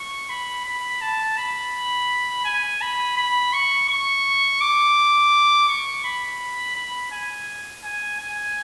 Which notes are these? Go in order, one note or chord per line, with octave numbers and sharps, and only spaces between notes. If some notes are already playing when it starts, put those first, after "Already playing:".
Already playing: C#6
B5
B5
A5
B5
G#5
B5
B5
C#6
C#6
D6
C#6
B5
B5
G#5
G#5
G#5